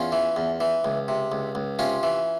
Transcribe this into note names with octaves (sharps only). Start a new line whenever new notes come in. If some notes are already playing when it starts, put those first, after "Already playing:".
Already playing: E2 C#4 F4
E3
E2
E3
C#2
C3
C#2
C#2
C3 C#4 F4
E3